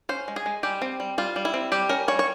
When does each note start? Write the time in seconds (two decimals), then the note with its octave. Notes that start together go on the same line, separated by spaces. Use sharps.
0.09 C#4 C5
0.28 G#3
0.36 G#4
0.46 G#3
0.63 G3 G4
0.82 C4
1.00 G3
1.18 G3 F4
1.36 G3
1.45 E4
1.54 C4
1.72 G3 G4
1.89 C#4 A#4
2.08 G3 C#5
2.19 C#5